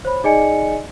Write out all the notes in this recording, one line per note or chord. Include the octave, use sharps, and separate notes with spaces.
C5 C#5 B5
D#4 G#4 D5 D#5 G#5 C#7